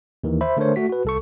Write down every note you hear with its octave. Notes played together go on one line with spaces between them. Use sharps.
D#2 D#3 E3
C5 E5 B5
D3 A3 D4 A#4 C5 C#5
A3 F#4 B6
F#4 B4
C2 A4 C#6